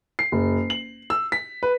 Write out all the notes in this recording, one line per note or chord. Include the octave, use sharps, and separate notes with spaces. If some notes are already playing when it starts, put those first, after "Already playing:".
C7
F#1
F#7
E6
B6
B4